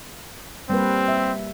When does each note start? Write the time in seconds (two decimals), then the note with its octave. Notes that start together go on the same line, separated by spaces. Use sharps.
0.70 G3 A#3 C4 B4
1.08 E5